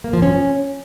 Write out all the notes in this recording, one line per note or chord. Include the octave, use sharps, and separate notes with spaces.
A#3
F3
C#4